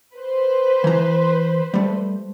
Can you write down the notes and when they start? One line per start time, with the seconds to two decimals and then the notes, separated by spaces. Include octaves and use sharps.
0.15 B4 C5
0.84 E3 A#5
1.74 G3 A3